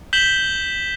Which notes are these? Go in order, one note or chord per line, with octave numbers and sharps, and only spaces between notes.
G6 B6 E7 F#7 G7